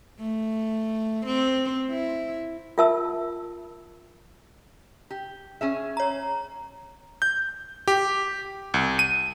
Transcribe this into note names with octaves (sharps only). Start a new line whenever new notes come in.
A3
C4
E4
F4 A#4 E5 A5 E6
G4
C#4 G#4 E5
C#5 A#5
G6
G4
C2
D#7